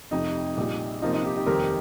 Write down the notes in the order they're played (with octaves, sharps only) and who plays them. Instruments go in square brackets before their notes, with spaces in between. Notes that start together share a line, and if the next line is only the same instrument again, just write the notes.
[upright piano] F1 F2 C3 [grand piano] D#4
[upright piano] A#1 A#2 G3
[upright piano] C3 F3 A#3 F4 [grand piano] D#4
[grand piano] D#4
D#4 G4
D#4 G4
[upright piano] F1 D#2 D#3 G3 C4 [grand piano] G4 A#4